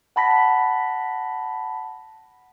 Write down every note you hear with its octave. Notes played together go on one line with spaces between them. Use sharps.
F#5 A5 B5 A#6 B6